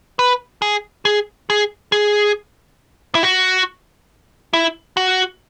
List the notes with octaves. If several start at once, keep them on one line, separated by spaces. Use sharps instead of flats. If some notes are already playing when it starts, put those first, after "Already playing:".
B4
G#4
G#4
G#4
G#4
E4
F#4
E4
F#4